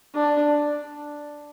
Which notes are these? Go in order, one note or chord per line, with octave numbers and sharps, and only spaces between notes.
D4